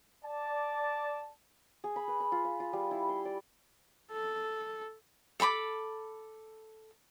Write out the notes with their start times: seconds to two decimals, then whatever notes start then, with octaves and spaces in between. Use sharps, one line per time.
0.23 D5 A5
1.84 G#4
1.96 B5
2.08 B4
2.20 B5
2.32 F4
2.45 F5
2.60 F4
2.73 G3
2.91 E4
3.09 C6
3.25 D5
4.11 A4
5.40 A4 A5 B5 D6